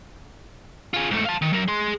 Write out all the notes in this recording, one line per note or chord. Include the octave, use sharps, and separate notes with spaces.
F4 G#4
G#2 A3
F5 A5
D#3
F#3 A#4
G#4 C6